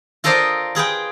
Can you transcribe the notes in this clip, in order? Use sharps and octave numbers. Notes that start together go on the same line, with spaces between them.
F4 A4 A#4 C5 D5 D#5
F4 G#4 B4 G5